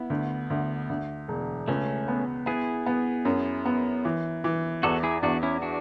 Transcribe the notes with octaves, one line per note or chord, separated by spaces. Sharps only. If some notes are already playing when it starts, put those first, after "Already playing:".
Already playing: B3 E4
D2
D2
D2
E1
C#2 A3 C#4
B3
B3 E4 G#4
B3
F#2
B3
E3
E3
E2 F#4 A4
E4 G#4
E2 D4 F#4
C#4 E4
D4 F#4